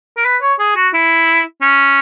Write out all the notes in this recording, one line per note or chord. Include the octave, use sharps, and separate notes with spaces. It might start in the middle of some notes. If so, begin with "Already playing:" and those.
A#4
B4
C#5
G#4
F#4
E4
C#4